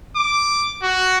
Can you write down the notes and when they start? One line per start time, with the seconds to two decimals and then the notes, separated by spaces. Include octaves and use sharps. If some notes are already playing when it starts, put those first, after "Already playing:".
0.16 D6
0.82 F#4